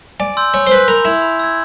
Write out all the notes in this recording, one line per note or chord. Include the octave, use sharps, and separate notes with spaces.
D5 G#5
C6 E6 G6
C#5 G#5
C5
B4 C6 E6 G6
A#4 B5
E4 E6 G#6
B5
E6 G#6